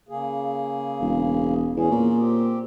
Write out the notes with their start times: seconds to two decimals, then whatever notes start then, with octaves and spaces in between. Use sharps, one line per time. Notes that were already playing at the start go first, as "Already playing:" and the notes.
0.09 C#3 A#3 G#4
1.01 E1
1.76 E2 C#4 G#4
1.91 A#2
2.19 C4 G4